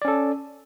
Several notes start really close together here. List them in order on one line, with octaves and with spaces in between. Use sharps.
D5 C#4 A4